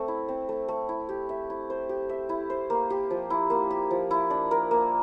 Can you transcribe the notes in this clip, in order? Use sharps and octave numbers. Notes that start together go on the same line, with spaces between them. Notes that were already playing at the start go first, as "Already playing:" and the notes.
Already playing: A3 C4
E4
C4
A3
A3
E4
G4
E5
E4
C5
G4
E5
E4
C5
A#3
G4
F3
E4
A#3
G4
F3
E4
D4
A#4
A#3